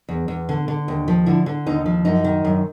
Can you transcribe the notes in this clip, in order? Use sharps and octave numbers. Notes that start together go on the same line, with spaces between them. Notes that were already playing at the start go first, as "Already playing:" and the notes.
E2
E2
D3
D3
D#2
F3
D3 E4
D3
D#2 D#4
F3
F#2 D#4
D#3
F#2